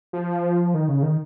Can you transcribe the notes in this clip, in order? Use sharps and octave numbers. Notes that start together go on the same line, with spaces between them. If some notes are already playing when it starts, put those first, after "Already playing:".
F3
D#3
C#3
D#3